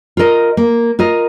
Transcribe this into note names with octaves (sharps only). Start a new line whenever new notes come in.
F4 A#4 D#5
A#3
F4 A#4 D#5